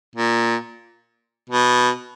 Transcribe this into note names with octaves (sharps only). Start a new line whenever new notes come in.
A#2
B2